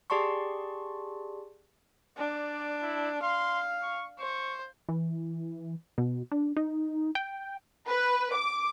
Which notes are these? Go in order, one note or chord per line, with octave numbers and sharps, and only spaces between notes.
G4 G#4 D5 A5 C6 C#6
D4 D5
E4
F5 C6
C#6
C5 C#6
E3
B2
D4
D#4
G5
B4
D6